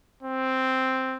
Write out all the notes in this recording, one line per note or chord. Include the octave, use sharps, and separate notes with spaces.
C4